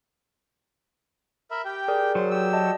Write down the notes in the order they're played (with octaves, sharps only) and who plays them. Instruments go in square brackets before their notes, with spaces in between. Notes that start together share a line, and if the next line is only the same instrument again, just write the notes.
[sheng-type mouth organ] A#4 E5 B5
G4 G5
[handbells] G#4 A#4 D5
[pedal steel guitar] F#3 [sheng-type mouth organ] C5
[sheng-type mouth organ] G4 E6
[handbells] D5 D#5 A5